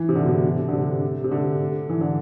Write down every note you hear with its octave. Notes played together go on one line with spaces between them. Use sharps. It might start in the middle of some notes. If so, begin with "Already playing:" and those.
Already playing: E3
C3
D3
B2
C3
D3
C3
C3
D3
E3
D3